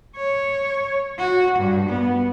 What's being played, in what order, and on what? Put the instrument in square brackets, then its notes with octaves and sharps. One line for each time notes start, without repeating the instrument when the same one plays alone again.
[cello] C#5
F#4
G2
B3